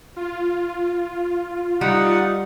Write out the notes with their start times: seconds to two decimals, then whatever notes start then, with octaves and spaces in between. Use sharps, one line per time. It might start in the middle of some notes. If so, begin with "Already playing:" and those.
0.16 F4
1.81 G3 D#4 F#5